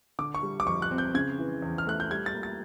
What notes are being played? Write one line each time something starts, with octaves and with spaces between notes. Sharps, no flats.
D3 D6
C#6
G3
D6
F2 C#6
F#6
C4
G6
C#3 G#6
E3
E2
F6
A3 F#6
G6
G3 G#6
A6
A#3
A6